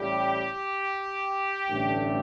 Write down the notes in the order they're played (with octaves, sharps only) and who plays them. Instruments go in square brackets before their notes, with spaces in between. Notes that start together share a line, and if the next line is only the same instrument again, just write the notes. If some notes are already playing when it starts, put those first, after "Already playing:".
Already playing: [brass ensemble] A1 A2 G3 G4
A1 G2 D3 A3 D4